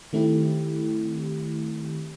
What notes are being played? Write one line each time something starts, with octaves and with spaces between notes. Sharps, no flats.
D#3 A3 C4 E4 G4